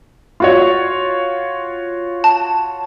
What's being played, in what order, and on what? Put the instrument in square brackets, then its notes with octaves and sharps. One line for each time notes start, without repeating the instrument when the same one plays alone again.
[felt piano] F4 F#4 C#5
[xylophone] A5